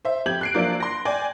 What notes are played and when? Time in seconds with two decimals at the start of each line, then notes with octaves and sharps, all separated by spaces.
0.05 C5 E5
0.26 F2 G4 G6 G#6 F#7
0.41 F#6 C7 D7
0.54 F3 F#3 A#3 D4 E4 D5
0.80 C6 A#6
1.05 D5 G5 G#5